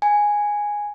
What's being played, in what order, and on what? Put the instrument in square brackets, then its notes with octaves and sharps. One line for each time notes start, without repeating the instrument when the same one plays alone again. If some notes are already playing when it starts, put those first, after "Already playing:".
[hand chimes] G#5